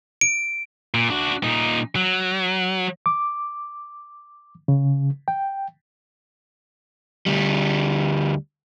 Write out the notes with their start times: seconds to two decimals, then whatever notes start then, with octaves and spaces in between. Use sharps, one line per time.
0.21 D7
0.94 A#2
1.10 D4 F#4
1.44 A#2 D#4
1.96 F#3
3.06 D6
4.68 C#3
5.28 G5
7.26 D2 G3